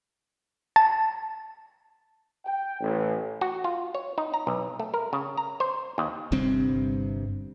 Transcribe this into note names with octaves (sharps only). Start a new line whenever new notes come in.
A5
G5
A1
F#4
F4
C#5
D#4
A#5
B1
A3
A#4
C#3
A#5
C5
D#2
G1 G2 C3 C4